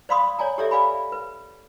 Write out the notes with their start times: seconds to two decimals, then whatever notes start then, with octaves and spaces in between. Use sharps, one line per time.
0.09 C5 D5 F5 B5 C6 D#6
0.39 C#5 D5 G#5 A#5
0.58 G4 A4 C#5 D5 E5
0.71 B4 D5 F5 G#5 B5
1.12 B4